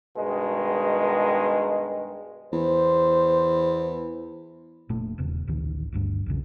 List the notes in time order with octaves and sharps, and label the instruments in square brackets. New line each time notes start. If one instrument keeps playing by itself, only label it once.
[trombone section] G2 B2 D#3 G#3
[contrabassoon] E2 [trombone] C5
[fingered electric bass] F1 A#2 A3
D#1 E2 C#3
A1 D2 D#3 E3
G1 D2 G2
B1 E2 C#3